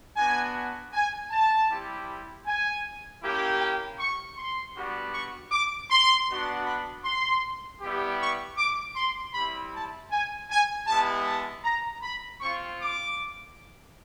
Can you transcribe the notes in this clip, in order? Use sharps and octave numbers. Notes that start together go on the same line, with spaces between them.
B3 D4 F#4 G#5
G#5
A5
G3 C4 E4 G4
G#5
A#3 C#4 E4 G4
G5
C#6
C6
G3 B3 D4 F#4
C#6
D6
C6
B3 D4 F#4
B5
C6
G3 B3 E4 G4
C#6
D6
C6
G3 C4 E4 B5
A5
G#5
G#5
G#3 B3 E4 G4 A5
A5
A#5
B5
C4 F4 C#6
D6